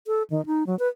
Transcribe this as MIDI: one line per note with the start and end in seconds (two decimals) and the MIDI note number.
0.07 0.23 69
0.30 0.45 51
0.46 0.66 63
0.67 0.77 54
0.79 0.88 71